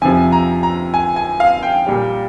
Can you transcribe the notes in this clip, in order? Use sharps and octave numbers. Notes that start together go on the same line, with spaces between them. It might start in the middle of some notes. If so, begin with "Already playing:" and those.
F2 C3 F3 G#5
A#5
A#5
G#5
G#5
F5
G5
A#2 G3